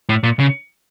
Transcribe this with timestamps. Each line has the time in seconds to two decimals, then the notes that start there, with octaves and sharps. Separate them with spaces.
0.09 A2
0.23 A#2
0.39 C#3